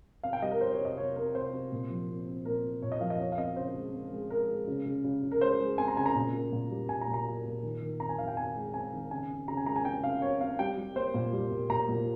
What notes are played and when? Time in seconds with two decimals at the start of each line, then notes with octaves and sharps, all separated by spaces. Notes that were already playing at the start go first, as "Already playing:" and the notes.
0.23 C3 F5
0.33 G5
0.42 G3 D#5
0.51 A#4
0.61 G3 C5
0.73 C#5
0.79 C3
0.85 D#5
0.97 C3 C#5
1.16 C4 A#4
1.35 C3 C5
1.53 C3
1.72 A#2
1.90 F3
2.08 C4
2.27 C4
2.45 A#2 A#4
2.64 C4
2.82 A#2 C#5
2.92 D#5
3.01 F3 F5
3.10 D#5
3.19 C4 C#5
3.32 F5
3.38 C4 D#5
3.56 C#3 C5
3.75 G#3
3.93 C4
4.12 G#3
4.30 G#3 A#4
4.49 G#3
4.67 C#3
4.86 C#3
5.04 C#3
5.23 C#3
5.31 A#4
5.41 G#3 C5
5.60 G#3
5.78 C4 G#5
5.88 A#5
5.97 C#3 G#5
6.06 A#5
6.15 A#2
6.34 A#3
6.52 A#2
6.71 G3
6.89 A#2 G#5
7.01 A#5
7.08 A#2
7.14 A#5
7.26 A#3
7.45 A#2
7.63 D#3
7.82 D#3
8.00 C4 A#5
8.09 G#5
8.19 D#3 F5
8.28 G5
8.37 C4 G#5
8.56 G#3
8.74 C4 G#5
8.93 D#3
9.11 C#3 G#5
9.30 C4
9.48 C#3 A#5
9.57 G#5
9.66 G#3 A#5
9.76 G#5
9.85 C4 G5
10.03 C#3 F5
10.22 C4 C#5
10.40 C4 F5
10.59 G3 G5
10.77 G3
10.96 A#3 C5
11.14 A#2
11.33 G3
11.51 A#2
11.70 A#2 A#5
11.89 A#2